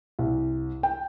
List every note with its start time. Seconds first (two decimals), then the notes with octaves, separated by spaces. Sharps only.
0.19 C2
0.83 G5